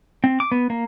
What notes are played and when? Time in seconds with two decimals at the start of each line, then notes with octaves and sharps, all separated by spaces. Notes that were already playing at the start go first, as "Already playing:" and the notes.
0.24 C4
0.40 D6
0.52 B3
0.70 A#3